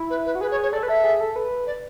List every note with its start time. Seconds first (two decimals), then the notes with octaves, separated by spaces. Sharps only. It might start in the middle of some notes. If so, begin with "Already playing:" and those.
Already playing: E4
0.10 B4
0.25 B4
0.35 F#4
0.41 G#4 B4
0.51 C#5
0.62 C#5
0.72 A4 D5
0.83 B4
0.88 A4 E5
1.04 G#4
1.20 A4
1.36 B4
1.66 D5